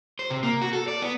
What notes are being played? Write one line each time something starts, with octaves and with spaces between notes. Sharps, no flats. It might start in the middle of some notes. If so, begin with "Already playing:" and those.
C5
C3
A#3
F#4
A4
D5
B3